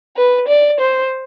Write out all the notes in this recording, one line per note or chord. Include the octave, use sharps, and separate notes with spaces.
B4
D5
C5